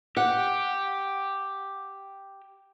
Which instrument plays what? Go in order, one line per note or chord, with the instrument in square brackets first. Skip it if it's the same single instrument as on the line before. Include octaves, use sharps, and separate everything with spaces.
[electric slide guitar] G4 [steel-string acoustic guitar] F#5